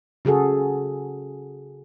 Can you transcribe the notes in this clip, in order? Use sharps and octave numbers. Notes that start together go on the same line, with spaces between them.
C#3 F#4 G#4 A4